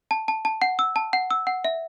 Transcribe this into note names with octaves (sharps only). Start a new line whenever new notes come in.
A5
A5
A5
F#5
E6
A5
F#5
E6
F#5
E5